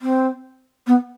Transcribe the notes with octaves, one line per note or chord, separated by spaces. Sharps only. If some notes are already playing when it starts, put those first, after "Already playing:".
C4
B3